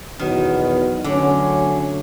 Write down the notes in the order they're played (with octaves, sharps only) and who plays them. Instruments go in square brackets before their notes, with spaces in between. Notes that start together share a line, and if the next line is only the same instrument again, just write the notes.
[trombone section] E2 B2 F#3 B3 [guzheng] D#3
[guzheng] D3 [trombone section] F#3 A3 C#4